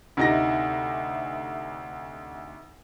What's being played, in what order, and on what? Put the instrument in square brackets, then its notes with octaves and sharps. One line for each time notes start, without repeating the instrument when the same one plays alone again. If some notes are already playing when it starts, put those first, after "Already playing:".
[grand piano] D2 C3 D#4 E4 A#6